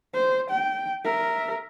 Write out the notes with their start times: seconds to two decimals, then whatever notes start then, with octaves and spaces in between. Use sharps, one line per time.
0.14 C5
0.50 G5
1.05 A#4 E5